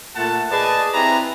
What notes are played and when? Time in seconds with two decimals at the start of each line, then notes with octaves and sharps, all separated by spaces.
0.16 A#2 A3 F#5 A5
0.50 G#4 B4 D5 D#5 A5
0.93 C4 E4 G4 B4 G#5 A#5